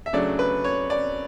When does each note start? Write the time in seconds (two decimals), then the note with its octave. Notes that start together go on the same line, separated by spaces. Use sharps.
0.06 E5
0.13 C#3 F#3 A3 D4 D5
0.39 B4
0.65 C#5
0.90 D5